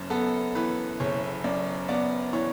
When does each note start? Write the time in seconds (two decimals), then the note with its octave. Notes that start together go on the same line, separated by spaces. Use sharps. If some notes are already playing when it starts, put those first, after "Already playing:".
Already playing: F#1 F#2
0.10 B3 A4
0.55 E3 B4
1.00 F#1 C#5
1.44 F#2 D5
1.88 B3 D5
2.33 E3 C#5